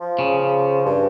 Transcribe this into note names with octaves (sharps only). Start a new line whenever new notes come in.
F3
C#3
G2